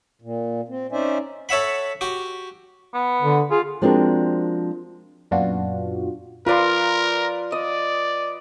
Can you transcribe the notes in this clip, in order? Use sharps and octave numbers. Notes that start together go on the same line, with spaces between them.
A#2
C4
C#4 D#4 C5 D5 E5 G#5
A4 C#5 E5 F#5 B5
F#4 G4
B3
D3
F4 G#4
F3 G#3 C4 D4 F#4 A#4
F#2 A#2 B3 D4 F4 F#4
F4 A#4 B4 D5 C6
D5 D#5